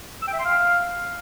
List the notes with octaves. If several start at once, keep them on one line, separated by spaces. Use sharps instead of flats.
E6
G5
E5
C6
F5